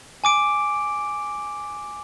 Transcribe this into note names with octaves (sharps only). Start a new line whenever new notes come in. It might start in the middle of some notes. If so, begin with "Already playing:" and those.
G#5 D6 D7